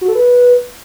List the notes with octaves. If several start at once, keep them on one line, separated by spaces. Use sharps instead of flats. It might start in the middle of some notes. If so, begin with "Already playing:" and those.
F#4
A4
B4